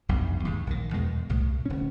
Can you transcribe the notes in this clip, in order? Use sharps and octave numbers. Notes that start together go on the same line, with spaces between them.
F1 B1 G2
D#2 G#2
A#1 D#3
E2 B2 G#3
C2 A2
D1 C#4